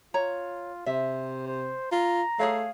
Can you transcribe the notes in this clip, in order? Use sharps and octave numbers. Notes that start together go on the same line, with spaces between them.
F4 C#5 A#5
C3 C5 E5
C5
F4 A#5
A3 G#4 C#5 F5